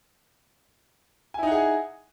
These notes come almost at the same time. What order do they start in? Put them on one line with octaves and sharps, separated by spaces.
G#5 E4 D#4 F#5 G#4